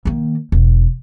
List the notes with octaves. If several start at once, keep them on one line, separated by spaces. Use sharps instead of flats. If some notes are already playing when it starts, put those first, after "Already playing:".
D#3 A#3
E1